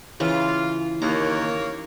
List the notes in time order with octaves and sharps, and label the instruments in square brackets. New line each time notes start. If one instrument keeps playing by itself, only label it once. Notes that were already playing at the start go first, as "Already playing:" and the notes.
[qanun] C#3 E3 [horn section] F4
[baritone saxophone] D#2 [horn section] A#3 C#5 [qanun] A#5